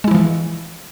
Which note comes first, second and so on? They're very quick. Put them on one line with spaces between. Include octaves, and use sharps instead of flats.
G#3 E4 F3 E3